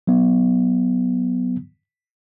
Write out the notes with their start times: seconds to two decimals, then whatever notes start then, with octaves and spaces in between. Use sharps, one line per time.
0.07 F#3 B3